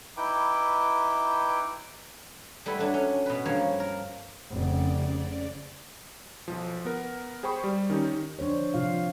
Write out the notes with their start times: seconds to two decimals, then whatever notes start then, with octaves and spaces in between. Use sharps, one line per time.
0.17 D#4 E4 B4 G5 D6
2.66 G3 A3 E4 B4 F#5
2.78 F#3 D4
2.94 C#4
3.26 B2 B4
3.46 G2 F3 A#3 C#5
3.80 A#4
4.50 F1 C#3 D5
6.48 B1 F3
6.85 B3 A#4
7.43 G#4 C5 G5 B5 C#6
7.64 G3
7.90 D#3 C#4 D#4 G4
8.39 F3 D4 C5 C#5
8.74 C3 F3 F4 F5